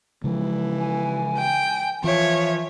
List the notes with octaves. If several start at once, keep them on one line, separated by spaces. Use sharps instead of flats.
C#3 E3 F3 G#3
G#5
G5
E3 F3 C#5 E5